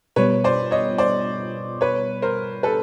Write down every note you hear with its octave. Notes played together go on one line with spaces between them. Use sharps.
B2 G3 B3 B4 C#5
C5 D5
C#5 D#5
C5 D5
B4 C#5
A#4 C5
A4 B4